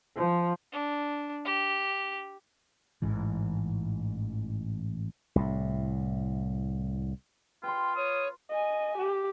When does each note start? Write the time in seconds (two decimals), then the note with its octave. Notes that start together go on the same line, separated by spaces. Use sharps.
0.16 F3
0.72 D4
1.45 G4
3.02 A1 G#2 E3
5.36 C2 A2
7.63 F4 B4 G5 C6
7.97 C#5 D#6
8.50 D#5 G#5
8.97 G4